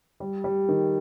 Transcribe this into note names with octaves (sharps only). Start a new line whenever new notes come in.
G3
G3
D#3